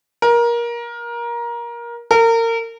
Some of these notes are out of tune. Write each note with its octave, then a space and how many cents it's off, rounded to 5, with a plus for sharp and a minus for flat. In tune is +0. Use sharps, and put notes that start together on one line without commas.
A#4 +20
A#4 -30